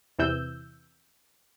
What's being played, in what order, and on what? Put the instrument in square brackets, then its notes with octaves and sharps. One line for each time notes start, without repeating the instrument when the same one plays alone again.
[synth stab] E2 C3 E3 E6 G6